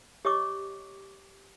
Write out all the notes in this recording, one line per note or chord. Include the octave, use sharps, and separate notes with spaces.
G4 C#5 D#5 C#6 D6